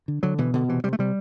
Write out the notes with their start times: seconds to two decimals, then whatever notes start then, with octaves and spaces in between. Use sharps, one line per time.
0.08 D3
0.23 D3 F#3
0.38 B2 E3
0.54 B2 D3
0.69 C3 E3
0.84 C3 G3
0.93 A3
0.99 C3 G3